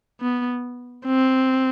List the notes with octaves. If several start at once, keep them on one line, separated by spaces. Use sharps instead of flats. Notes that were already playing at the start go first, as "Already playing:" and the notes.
B3
C4